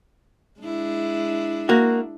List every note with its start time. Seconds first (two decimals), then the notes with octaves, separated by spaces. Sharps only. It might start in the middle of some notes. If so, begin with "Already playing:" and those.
0.60 G#3 D4 E4
1.69 A#3 F#4